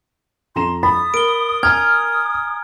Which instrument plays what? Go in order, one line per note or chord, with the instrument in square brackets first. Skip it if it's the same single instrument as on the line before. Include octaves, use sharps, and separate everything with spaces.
[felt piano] F2 A#5 E7 [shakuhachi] C6
[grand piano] B5 [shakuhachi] D#6 [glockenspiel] A6
[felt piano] A#4 [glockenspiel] D7 G7
[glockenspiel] G#5 A#5 G#6 [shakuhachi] D#6 [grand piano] F6